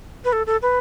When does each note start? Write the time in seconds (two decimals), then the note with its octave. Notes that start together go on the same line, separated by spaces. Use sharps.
0.25 B4
0.33 A4
0.47 A4
0.62 B4